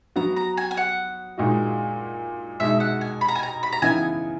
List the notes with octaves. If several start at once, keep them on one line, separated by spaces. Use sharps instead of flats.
F#3 B3 F#4 A#5
A#5
G#5
G#5
F#5
A#2 G#3 D#4 F#4
B2 G#3 D#4 E5
F#5
G#5
B5
A#5
G#5
A#5
B5
A#5
C#3 E3 B3 D#4 G#5